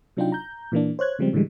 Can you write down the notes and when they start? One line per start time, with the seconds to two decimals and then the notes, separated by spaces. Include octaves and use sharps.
0.17 C3 F#3 D4 D#4 F4 G5
0.32 A#5 G6
0.72 A#2 E3 A#3 D4
0.99 C5 C#5 F#6 G#6
1.19 C#3 F3 G3 G#3 C4
1.33 A2 D3 E3 G3 G#3